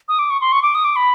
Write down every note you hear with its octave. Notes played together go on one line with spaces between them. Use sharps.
D#6
D6
C#6
C6
C#6
D6
D#6
D6
B5